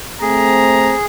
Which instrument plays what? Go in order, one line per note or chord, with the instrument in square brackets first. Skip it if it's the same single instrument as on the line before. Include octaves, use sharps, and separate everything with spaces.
[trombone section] A3 C4 [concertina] G#4 [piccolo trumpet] A#5